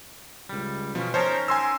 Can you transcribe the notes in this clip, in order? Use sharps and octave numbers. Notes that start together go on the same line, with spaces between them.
C#2 G3
B2 F3 B3 C#4
C#4 D#4 A#4 C5 C#5 A5
G#5 C6 E6